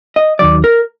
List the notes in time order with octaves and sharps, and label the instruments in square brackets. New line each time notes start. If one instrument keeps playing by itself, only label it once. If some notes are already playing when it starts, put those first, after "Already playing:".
[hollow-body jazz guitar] D#5
[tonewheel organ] D#2 D#3 F#3 [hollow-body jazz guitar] D5
[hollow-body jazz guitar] A#4